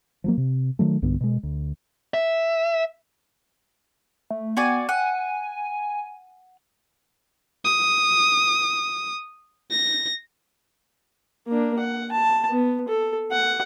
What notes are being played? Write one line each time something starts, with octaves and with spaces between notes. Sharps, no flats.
F3 F#3 A#3
C3
D#3 F#3 A3
B1 G2 D3 B3
B2 G#3
D2
E5
A3
B3 F#4 D5 G#5
F#5 G#5
D#6
A#6
A#3 D4
F#5
A5
B3
A4
F#5